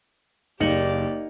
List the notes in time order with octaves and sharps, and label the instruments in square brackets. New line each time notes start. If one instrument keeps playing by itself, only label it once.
[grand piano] F#1 C#7 F#7 [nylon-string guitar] A#3 D#4 [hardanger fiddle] G4 D5